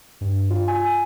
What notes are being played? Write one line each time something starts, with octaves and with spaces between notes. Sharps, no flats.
G2
F4
G#5